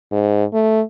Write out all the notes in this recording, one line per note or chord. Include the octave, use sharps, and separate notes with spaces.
G#2
A3